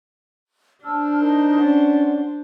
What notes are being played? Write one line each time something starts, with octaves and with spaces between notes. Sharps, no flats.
D4 C5 A5 E6 F6
D#4 A#4 A5
C#4 D5 F#5